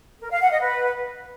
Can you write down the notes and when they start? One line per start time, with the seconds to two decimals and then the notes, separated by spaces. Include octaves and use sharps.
0.21 A#4
0.31 F5
0.41 F#5
0.51 D#5
0.61 B4